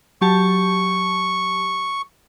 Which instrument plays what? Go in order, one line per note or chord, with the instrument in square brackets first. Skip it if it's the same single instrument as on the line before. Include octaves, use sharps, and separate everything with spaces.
[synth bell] F#3 G4 A5 [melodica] C#6